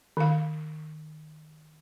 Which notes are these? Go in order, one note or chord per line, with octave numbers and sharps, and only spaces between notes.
D#3 F5